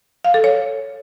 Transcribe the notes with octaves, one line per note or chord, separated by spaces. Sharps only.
F5
A4
C#5